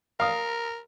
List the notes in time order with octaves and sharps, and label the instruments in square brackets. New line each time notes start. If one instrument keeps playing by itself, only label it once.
[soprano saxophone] A#4 [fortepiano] F5 D#6